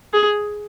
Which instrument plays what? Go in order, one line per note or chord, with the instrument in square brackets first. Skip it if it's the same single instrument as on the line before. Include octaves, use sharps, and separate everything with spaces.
[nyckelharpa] G#4